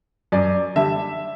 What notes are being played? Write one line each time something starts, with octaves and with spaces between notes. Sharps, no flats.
F#2 D5
D3 G3 E5